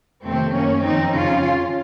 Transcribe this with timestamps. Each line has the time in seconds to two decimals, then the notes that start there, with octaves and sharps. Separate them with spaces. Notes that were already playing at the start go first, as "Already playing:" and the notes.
0.24 F2 C3 D#3 A3 C4
0.54 F#2 D#3 A#3 C#4
0.84 F2 D#3 C4 D#4
1.14 F2 C#3 C#4 F4
1.44 F2 C#3